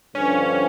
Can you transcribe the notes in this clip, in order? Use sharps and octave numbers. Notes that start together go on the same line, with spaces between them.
G2 D3 F3 C#4